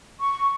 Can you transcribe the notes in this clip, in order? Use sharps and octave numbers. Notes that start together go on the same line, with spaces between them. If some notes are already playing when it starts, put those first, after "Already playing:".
C#6